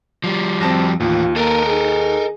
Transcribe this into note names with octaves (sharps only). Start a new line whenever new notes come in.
F3 G3
F2 C4 A5 A#6
D#2 A2 E3 F4
A#3 A4 A#4 D#5 A#5
G#4